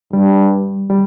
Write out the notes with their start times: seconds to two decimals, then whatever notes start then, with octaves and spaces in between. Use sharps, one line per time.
0.13 G2 G3
0.90 G3